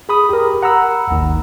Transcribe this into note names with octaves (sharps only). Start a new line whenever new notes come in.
G#4 B5 D#6
G4 A#4
F#5 A#5 B5 E6
G#1 D#2 D#3